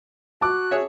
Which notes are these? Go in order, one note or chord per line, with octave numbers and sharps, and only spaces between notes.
F#4 A5 D6 F#6
G#4 C#5 E5